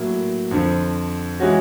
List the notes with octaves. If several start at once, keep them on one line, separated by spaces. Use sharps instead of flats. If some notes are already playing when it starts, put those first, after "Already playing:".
Already playing: A2 F#3 A#3
F2 D3 F3
E3 G#3 C#4 F#4